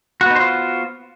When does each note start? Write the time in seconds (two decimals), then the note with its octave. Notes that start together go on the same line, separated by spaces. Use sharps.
0.21 F#4
0.26 B3
0.31 D#4
0.36 C5
0.40 F4